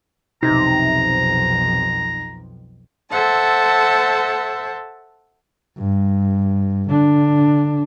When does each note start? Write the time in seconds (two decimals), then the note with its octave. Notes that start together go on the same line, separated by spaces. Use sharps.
0.42 B1 F2 C3 D#4 A#5
3.10 A4 C5 E5 F#5 A5
5.78 G2
6.89 D3 D4